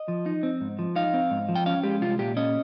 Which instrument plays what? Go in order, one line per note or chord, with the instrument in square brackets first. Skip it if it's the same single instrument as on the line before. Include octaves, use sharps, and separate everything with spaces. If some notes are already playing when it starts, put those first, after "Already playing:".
Already playing: [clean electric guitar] D#5
F3
D#4
C4
G#2
F3
D#4 F5
C4
G#2
F3
G5
C#4 F5
G#3 G4
C2 F4
A#2 G4
C#4 D#5